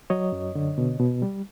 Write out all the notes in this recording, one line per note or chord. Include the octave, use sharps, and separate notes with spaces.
F#3 C#5 D#5
F#2
D3
B2
B2
G3